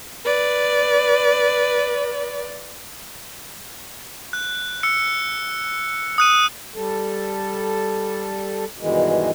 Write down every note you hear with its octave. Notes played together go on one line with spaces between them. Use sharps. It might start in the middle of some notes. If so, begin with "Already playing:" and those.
B4 D5
F#6
E6 C#7
D#6 F#6 D#7
G3 A4
G2 B2 D#3 E3 G#3